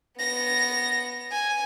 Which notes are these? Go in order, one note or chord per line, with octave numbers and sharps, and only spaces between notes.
B3 A#6
G#5